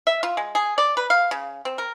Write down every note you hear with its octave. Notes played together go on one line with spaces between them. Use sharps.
E5
F4
G#3
G#4
D5
B4
F5
C#3
C4
A#4